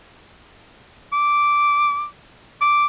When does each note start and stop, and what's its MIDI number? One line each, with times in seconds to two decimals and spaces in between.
1.13 2.05 86
2.61 2.86 86